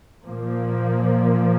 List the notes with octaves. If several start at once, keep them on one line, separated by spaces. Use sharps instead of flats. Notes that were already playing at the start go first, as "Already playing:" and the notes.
A#2 F3 A#3